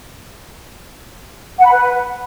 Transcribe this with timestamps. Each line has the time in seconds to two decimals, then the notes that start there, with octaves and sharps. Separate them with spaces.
1.59 F#5
1.65 B5
1.71 B4